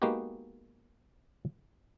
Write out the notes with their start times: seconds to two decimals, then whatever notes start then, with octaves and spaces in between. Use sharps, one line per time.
0.02 G#3 A#3 B3 D#4 F#4 G4